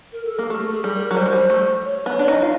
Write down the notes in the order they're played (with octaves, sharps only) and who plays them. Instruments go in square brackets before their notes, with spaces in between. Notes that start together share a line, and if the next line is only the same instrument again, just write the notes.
[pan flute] A#4
A4
[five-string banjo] A#3 [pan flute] G#4
[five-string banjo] A3 [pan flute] G4
[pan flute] A4
G#4
[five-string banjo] G3
[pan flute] A#4
[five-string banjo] F#3
[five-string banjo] G3 [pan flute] C5
[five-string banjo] G#3
G3
A3
[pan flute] C#5
[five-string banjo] B3
D4
D#4
F4